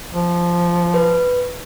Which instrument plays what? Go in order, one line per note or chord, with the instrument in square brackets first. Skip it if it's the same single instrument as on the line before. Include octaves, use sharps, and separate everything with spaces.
[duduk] F3
[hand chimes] B4